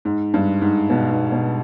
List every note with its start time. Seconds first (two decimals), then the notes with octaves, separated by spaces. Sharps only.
0.05 G#2
0.34 G2
0.62 G#2
0.90 B2
1.11 G#2
1.32 B2